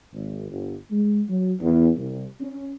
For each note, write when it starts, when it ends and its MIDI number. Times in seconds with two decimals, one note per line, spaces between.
0.13 0.47 32
0.50 0.75 31
0.91 1.23 56
1.29 1.53 54
1.61 1.89 40
1.96 2.25 36
2.41 2.72 61